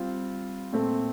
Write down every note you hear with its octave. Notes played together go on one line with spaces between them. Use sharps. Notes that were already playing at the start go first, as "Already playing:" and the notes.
Already playing: G3 C4 F4
A#2 A3 C4